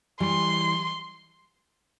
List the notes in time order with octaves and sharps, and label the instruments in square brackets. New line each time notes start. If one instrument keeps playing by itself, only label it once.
[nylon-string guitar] E3 G3 [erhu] C6